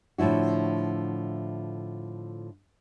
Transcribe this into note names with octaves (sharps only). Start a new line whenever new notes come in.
A2 D3 F3 E4 F#4